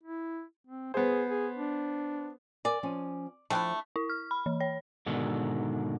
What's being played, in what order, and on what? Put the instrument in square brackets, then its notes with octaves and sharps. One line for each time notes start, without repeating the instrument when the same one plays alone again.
[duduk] E4
C4
[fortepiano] B3 C5 [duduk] G#4
[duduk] G#4
D4
[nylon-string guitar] A#4 G#5 [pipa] D5
[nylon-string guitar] F3 C#4 G#5
[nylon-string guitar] F3 G5 [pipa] A3 D4 E4
[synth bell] E4
F6
B5
E3
C#5
[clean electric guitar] G#2 B2 D3 D#3